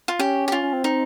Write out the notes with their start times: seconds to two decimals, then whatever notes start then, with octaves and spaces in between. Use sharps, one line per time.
0.08 F4
0.19 C#4 G4
0.48 G4
0.52 C#4 F4
0.63 C#4
0.73 C4
0.84 D#4